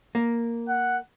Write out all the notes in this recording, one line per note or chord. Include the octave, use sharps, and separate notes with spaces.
A#3
F#5